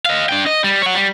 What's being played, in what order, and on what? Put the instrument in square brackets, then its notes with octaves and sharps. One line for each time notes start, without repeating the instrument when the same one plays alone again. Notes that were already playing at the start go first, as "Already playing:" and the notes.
[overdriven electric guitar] D#5 F5
D4 G5
D#5
G3
C#5 F#5
G3